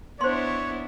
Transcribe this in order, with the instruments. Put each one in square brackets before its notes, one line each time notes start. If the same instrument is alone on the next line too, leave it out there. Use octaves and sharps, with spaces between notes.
[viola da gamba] B3 D4 E4 [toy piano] C5 C6 [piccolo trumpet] C#5